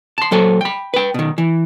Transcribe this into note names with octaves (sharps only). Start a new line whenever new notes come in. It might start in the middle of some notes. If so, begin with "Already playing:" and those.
A5 C6
A#2 F#3 A4 C5 G#5
G5 B5
B4 G5
B2 D#3
E3